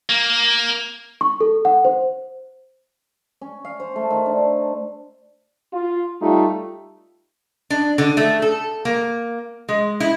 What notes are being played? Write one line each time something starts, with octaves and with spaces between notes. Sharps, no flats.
A#3
C#6
A4
F#5
C5
C#4
F5
C5
A3
D#3
D4
F4
G3 A3 D#4 F4
D4
D3
A3
A4
A#3
G#3
E4